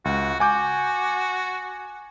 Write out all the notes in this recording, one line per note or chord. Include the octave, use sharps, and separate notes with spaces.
C#2 F#4
F#4 G#5 D6 G6